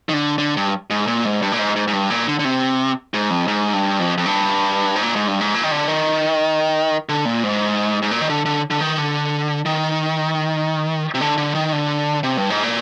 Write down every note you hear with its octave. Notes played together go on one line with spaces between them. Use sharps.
D#3
D3
D3
G2
G#2
A#2
G#2
G2
A#2
G#2
G#2
G#2
G2
A#2
D3
D3
C3
G#2
F2
G#2
G2
F2
F2
G2
G#2
A#2
G#2
G2
G#2
A#2
D#3
D3
D#3
D3
A#2
G#2
G#2
A#2
D#3
D3
D3
D3
D#3
D3
D#3
C3
D3
D3
D#3
D3
C3
G2
G#2
A#2